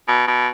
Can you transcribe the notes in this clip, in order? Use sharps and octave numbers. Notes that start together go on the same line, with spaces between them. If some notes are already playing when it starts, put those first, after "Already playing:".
B2
B2